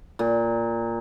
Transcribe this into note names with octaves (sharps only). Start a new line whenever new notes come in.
A#2